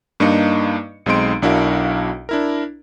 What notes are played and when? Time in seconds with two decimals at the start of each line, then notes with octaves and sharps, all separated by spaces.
0.20 G2 A#3 D4 D#4 D#5 C#7
1.06 B1 G#3 C4 D#4 C6 D7
1.42 B1 D4 E4 F#4 A#4 F5
2.29 D4 E4 A#4